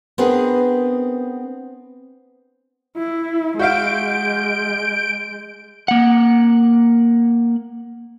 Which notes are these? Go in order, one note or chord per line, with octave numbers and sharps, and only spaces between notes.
B3 C4 D4 G#4 A#4 B4
E4
G#3 F#4 E5 F5 G6 D7
A#3 F#5